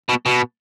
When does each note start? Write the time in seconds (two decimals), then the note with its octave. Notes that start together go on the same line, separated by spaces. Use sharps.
0.09 B2
0.26 B2